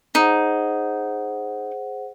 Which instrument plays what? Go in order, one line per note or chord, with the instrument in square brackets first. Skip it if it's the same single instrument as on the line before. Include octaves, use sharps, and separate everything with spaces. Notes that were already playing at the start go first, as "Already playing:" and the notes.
[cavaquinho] D#4 [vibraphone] G#4 C5 F#5